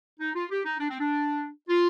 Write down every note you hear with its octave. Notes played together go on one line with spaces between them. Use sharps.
D#4
F4
G4
D#4
D4
C4
D4
F4